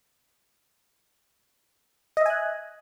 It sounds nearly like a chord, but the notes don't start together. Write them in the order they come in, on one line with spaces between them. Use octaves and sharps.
D#5 E5 G#5 F#6